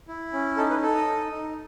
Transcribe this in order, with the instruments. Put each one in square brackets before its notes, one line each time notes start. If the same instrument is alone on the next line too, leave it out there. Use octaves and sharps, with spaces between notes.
[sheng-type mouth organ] E4
C#4
D#4 A4
B4
A4
D#5
D#4
D#4